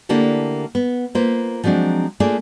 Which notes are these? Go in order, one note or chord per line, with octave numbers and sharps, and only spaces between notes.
D3 A3 A#3 D4 E4 G4
B3
A#3 F4 B4 C5
F3 F#3 G#3 C4 D4
A3 A#3 D4 F4 G#4 D5